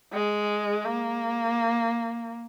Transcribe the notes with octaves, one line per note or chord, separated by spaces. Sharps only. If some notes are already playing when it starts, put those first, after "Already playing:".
G#3
A#3